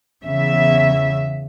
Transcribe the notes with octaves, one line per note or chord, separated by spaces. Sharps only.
E2 C#3 E5